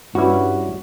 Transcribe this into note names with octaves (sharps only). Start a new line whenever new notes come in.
G2 G3 C#4 E4 F#4